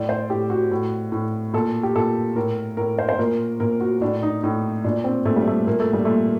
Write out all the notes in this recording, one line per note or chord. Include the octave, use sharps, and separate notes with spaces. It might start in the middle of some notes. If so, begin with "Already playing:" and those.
Already playing: A2 D5
C5
A2 G4
F#4
A2
A2
A#2 A4
G4
A#2 A4
A2 A#4
A2 A#4
C5
C5
A#2 A#4
A#2 A#4
F#4
A2 D4
D#4
A2 D#4
A#2 D4
C4
A#2 A3
G3
A3
A#2 A#3
A3
G3
A#2 A3